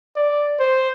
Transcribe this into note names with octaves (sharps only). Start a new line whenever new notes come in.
D5
C5